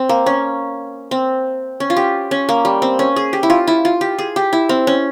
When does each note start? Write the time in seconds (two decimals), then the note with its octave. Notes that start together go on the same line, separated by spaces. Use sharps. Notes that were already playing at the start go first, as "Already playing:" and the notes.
Already playing: C4
0.09 A#3
0.26 C#4
1.11 C4
1.80 C#4
1.90 F4
1.96 G4
2.31 C#4
2.49 A#3
2.65 G3
2.82 C4
2.99 C#4
3.16 G#4
3.33 G4
3.43 E4
3.50 F4
3.67 E4
3.85 F4
4.01 G4
4.19 G#4
4.36 G4
4.53 E4
4.69 C4
4.87 C#4